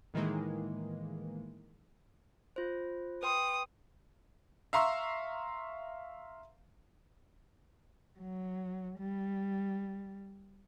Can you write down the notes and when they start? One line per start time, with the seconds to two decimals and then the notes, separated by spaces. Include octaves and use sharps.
0.14 A2 D#3 E3 G#3 A#3
2.56 F4 C5
3.23 B4 G5 C6 D#6
4.73 E5 F5 A#5 C6 C#6 E6
8.21 F#3
8.99 G3